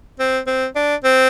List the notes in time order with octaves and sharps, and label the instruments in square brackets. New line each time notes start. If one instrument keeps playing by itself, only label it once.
[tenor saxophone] C4
C4
D4
C4